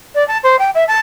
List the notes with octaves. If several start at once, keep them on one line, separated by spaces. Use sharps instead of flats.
D5
A5
C5
G5
E5
A5